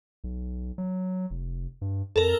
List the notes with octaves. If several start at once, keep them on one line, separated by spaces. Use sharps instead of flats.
B1
F#3
F1
G2
F2 A4 A#4